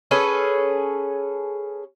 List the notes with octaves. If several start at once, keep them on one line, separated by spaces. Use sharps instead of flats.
C#4 G#4 A4 B4